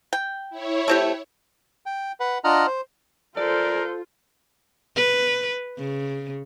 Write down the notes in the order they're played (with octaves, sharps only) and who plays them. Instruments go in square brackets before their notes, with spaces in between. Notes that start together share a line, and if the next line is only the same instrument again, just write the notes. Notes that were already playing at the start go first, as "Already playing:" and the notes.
[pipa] G5
[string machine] E4 C#5
[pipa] A3 C4 G4
[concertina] G5
B4 F#5
D4 F4 D#5 F#5 A#5 F6
C5
[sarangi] F4 [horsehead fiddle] A4 C5 [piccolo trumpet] A#4 [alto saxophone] D5
[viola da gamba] B4
C#3